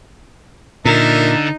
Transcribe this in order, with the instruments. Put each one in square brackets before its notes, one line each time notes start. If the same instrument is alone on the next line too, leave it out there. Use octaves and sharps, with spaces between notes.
[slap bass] A#2 [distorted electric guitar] D3 [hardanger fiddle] D#4 [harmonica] A#4 E5